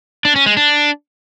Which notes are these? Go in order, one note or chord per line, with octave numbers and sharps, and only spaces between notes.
D4
C#4
G#3
D4